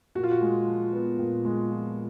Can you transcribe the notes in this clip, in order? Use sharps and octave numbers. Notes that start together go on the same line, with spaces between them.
A#2 F#4
F4
F#4
G#3
F3
B3
A#2
G#3
F3